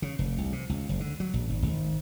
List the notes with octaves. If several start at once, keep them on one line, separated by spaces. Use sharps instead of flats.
C#3
F1
C2
C3
C#2
F#1
D3
F#3
A#1
G#1
G#1